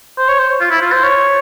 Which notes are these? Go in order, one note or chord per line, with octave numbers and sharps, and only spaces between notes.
C5
C#5
C5
F4
E4
F4
C5
C#5